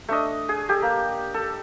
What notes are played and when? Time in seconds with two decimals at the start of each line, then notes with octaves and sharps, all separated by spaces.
0.09 A3 D4 D#5
0.49 G#4
0.69 G4 A4
0.82 A#3
1.34 A4